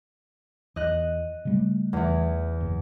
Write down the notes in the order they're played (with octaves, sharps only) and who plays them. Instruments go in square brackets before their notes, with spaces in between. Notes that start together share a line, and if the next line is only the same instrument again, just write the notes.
[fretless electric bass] E2 [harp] D#5 F#6
[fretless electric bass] C#3 G3 A3
[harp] E2 E3
[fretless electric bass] F#1